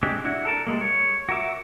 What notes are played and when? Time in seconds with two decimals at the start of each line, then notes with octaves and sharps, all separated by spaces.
0.03 G#3 C4 D4 G4
0.25 D4 E4 F#4
0.45 A4 A#4 A5
0.67 G3 G#3 A#3
0.81 C#5
1.29 F#4 A#4 E5 D6